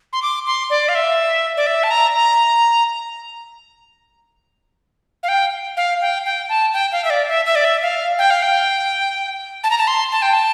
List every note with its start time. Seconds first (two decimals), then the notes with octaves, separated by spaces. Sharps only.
0.13 C6
0.22 D6
0.46 C6
0.70 D5
0.89 F5
0.95 E5
1.57 D5
1.67 E5
1.83 A5
1.91 A#5
2.15 A#5
5.23 F5
5.29 G5
5.77 F5
6.01 G5
6.25 G5
6.49 A5
6.74 G5
6.92 F5
7.05 E5
7.10 D5
7.28 E5
7.46 E5
7.55 D5
7.65 E5
7.82 F5
8.19 G5
8.30 F5
8.42 G5
9.64 A5
9.71 A#5
9.78 A5
9.87 C6
10.12 A5
10.22 G5
10.34 A5